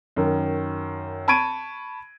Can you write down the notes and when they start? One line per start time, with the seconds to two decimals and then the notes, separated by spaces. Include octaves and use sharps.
0.17 F#2 D#3
1.28 A5 B5 C#6 G#6 D7 D#7